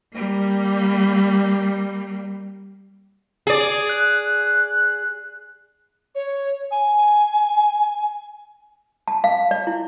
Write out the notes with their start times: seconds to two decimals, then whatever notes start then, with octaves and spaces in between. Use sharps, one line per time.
0.14 G3 A#3
3.47 G#4 D5
3.89 F#6
6.15 C#5
6.71 G#5
9.08 A5
9.24 F5
9.51 D5
9.67 E4